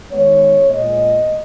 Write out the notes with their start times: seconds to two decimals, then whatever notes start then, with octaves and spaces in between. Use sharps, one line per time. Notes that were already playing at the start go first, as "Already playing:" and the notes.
0.11 D#3 G#3 B3 C#5
0.69 A#2 G#3 B3 D#5